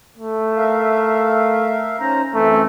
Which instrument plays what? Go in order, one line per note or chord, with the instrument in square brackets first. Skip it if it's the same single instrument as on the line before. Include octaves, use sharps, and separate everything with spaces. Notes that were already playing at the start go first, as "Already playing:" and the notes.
[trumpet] A3
[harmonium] A#4 E5 F5
[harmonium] C#4 D#4 C5 [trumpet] A#5
[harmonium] F#2 E3 C4 [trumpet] A3